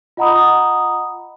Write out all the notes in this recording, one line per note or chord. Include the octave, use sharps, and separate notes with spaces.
F4 D#5 F#5 A#5 B5 D#6